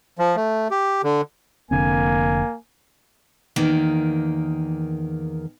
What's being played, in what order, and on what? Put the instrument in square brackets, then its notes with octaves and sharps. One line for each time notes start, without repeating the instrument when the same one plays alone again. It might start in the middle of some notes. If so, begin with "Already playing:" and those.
[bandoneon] F3
A3
G4
D3
[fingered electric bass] F1 D3 C4 [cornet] A#3 [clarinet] G#5
[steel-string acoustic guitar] E2 D#3 A#3